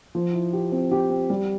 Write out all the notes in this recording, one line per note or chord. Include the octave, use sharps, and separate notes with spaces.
F3
E4
G4
C4
G4
C4
G3